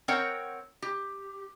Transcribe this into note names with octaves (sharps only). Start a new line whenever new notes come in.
C4 A#4 C#5 F#5 G5
G4